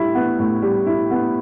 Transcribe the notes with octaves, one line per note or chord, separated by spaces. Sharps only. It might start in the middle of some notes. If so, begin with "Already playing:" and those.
Already playing: A2 G3 E4
B3
A2
G3
E4
B3